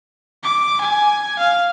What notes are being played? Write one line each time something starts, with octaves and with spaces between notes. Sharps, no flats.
D6
G#5
F5